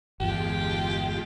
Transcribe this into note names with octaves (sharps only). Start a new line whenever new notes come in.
G1 E2 G#3 F4 G4